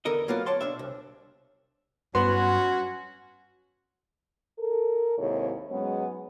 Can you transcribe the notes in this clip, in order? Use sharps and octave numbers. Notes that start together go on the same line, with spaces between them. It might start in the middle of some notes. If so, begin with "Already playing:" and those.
E2 D3 B3 A4 A#4 D#5
F#3 A#3 B3 F4 A#4 D5
C#5 D5 A5 C6
B2 D4 E5
C2
G2 F#3 B3 C#4 F#4 C6
A4 A#4
D#2 G#2 C3 E4 C#5
G#2 F#3 G#3 B3 C#4 C#5